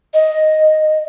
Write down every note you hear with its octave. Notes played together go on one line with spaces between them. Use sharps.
D#5